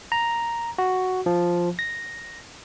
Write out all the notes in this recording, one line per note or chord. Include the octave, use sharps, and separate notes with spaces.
A#5
F#4
F3
A#6